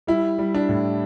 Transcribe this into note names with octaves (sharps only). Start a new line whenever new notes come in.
G3 E4
G3
D4
A2